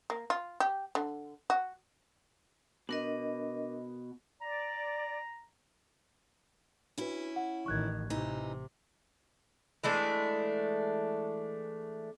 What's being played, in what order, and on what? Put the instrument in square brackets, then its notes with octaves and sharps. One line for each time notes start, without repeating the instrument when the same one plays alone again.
[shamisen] A#3
F4
G4
D3
F#4
[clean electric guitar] B2 [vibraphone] D4 A#4 D#5
[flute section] D5 [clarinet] A#5
[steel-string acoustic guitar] C#4 E4 [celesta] D4 F#4 B4
[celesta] F#5
[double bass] A1 D#3 [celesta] C#6 F#6 G#6
[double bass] C3 [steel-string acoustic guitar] E3 D#4
[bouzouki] E3 G#3 A3 D4